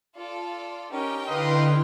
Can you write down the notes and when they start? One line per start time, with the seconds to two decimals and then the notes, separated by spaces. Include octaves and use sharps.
0.17 F4 A4 D5
0.92 C#4 D#4 G4 A#4 G5
1.28 D3 E4 B4 D#5 F5 C6